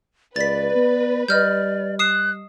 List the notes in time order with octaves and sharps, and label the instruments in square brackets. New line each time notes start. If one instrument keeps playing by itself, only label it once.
[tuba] C#2 [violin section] B4 [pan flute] D5 [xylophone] A6 B6
[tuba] B3
[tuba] G3 [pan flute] D5 [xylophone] D#5 F6 G6
[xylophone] D#6 C7 E7 [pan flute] F#6